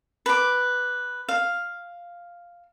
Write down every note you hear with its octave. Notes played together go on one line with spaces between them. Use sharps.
B4 D6
F5